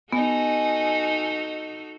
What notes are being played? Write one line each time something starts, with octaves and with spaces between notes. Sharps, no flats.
B3 D#4 F#4 A4 D#5 G#5